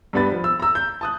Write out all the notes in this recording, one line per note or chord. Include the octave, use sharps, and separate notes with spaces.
G2 G3 B3 B5 A6
F3
E6
A#5 E6
G6
A5 D#6 F#6